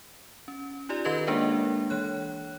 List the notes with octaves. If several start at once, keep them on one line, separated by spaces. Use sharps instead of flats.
C#4
D#4 F4 G4 D5
D#3 G4 A4 B4 D#5 G#6
G#3 A#3 D4 A#4 E5
E3 C#5 F#6